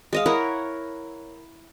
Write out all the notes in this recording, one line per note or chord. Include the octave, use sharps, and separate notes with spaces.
G#3 D#5 F5
E4 A#4 C#5 F#5